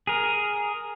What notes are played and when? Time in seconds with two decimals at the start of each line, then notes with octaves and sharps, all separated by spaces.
0.07 G#4 A#4